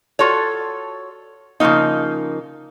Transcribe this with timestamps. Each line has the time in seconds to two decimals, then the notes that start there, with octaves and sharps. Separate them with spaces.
0.19 F4 F#4 A4 C#5
1.60 C#3 F3 G3 A#3 D#4